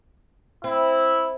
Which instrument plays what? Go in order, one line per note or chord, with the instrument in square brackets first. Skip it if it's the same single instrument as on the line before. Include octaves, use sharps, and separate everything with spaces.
[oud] C4 [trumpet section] E4